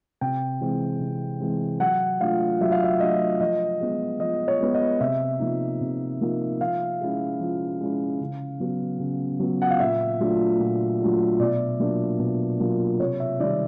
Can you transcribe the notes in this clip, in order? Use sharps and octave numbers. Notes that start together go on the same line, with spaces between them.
C3 G5
E3 G#3 C4
C3
E3 G#3 C4
F#3 F#5
A3 D4 F4 F5
F#3 E5
F5
E5
A3 D4 F4 D#5
F3 D#5
G#3 B3
F3 D#5
C#5
G#3 B3
D#5
C3 E5
F3 A#3 D#4
C3
F3 A#3 D#4
F3 F5
G#3 C#4 E4
F3
G#3 C#4 E4
C#3
F#3 B3
C#3
F#3 B3
F#5
F5
A#2 E5
F#3 A3 D4 F4
A#2
F#3 A3 D4 F4
B2 D5
F#3 A#3 D4 F4
B2
F#3 A#3 D4 F4
C3 C#5
E5
D#3 G3 D5